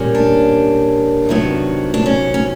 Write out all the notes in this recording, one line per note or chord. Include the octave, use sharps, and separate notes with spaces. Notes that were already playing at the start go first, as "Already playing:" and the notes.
Already playing: A#2 G3 A#3 C#4
D4
C3 D#3 F#3 B3
D4
C#4
C#4